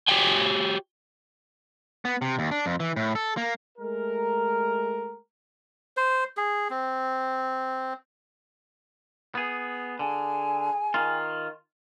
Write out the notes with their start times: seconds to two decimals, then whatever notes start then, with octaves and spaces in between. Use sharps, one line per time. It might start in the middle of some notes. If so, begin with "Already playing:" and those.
0.08 F#4 G4 C#5 G5 G#5
2.05 B3
2.22 C3
2.39 D#2
2.51 D4
2.66 F2
2.80 E3
2.97 A2
3.15 A4
3.37 A#3
3.78 G#3 A3 A#4
5.97 C5
6.37 G#4
6.70 C4
9.35 B3 G#4
9.99 D3 G#4 G#5
10.94 D#3 F4